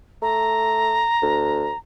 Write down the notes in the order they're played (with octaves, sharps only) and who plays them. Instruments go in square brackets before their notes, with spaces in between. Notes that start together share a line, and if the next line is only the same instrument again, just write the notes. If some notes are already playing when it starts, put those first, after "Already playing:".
[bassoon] A3 [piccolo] A#5
[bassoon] D2